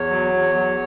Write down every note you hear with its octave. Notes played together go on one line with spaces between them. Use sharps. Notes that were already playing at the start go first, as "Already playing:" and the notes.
Already playing: E2 C#5
F#3
E2
F#3